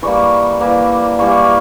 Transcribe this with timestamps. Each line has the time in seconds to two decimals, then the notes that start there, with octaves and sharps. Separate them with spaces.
0.02 E3 G3 A#3 C#6
0.60 E3 G3 A#3
1.19 E3 G3 A#3 C#6